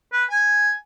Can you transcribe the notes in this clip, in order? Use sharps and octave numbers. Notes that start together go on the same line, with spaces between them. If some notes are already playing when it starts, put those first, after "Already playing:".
B4
G#5